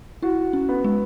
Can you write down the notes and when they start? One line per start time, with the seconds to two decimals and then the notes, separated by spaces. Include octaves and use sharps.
0.22 E4 F#4
0.53 C#4
0.69 B3
0.84 G#3